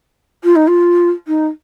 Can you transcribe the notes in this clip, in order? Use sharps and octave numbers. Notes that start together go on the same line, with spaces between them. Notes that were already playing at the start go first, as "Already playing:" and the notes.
F4
D#4
F4
D#4